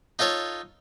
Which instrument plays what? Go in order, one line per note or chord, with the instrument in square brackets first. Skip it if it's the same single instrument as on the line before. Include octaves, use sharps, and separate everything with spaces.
[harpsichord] D#4 F4 A4 C#5